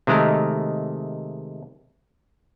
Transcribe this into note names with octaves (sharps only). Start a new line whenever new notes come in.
C3 D#3 G#3 A3 A#4